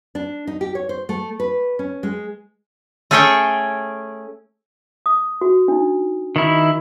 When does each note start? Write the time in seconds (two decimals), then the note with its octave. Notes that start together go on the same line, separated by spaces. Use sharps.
0.15 D4
0.47 D#4
0.61 G4
0.75 C#5
0.89 C5
1.09 A3
1.40 B4
1.79 C#4
2.03 G#3
3.11 A3 C#4 G#4 A4 C#5 G5
5.06 D#6
5.41 F#4
5.68 D4 D#4
6.36 D#3 E4